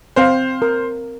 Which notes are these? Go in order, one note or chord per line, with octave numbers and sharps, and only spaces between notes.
C4 C5 F5
A#4